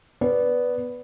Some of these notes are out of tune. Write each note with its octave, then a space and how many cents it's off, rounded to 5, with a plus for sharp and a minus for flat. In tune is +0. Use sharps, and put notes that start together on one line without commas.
B3 +0 D5 -10